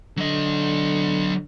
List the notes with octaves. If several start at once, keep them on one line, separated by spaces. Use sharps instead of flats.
D3 F#3 D#5